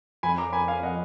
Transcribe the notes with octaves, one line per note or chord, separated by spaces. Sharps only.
F2 G#5 B5
A#5 D6
G#5 B5
F5 G#5
D#5 F#5